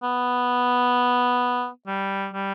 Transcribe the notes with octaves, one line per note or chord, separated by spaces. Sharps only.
B3
G3
G3